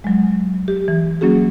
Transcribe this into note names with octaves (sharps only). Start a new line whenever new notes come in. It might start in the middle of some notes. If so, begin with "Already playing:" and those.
F#3 G#3
G4
E3
F#3 A#3 C#4 F#4 G#4